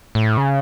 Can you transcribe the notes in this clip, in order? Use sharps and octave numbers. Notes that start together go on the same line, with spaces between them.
A2
C#3